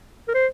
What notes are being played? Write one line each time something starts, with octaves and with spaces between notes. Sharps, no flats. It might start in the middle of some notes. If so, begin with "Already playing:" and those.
A#4
C5